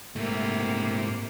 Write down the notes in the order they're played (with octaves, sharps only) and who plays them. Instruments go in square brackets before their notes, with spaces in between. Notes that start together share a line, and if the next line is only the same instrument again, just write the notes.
[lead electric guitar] G#2 A3 [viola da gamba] C3 A#3